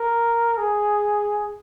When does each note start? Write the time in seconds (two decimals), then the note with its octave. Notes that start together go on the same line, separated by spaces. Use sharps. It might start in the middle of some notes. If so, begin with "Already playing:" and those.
Already playing: A#4
0.58 G#4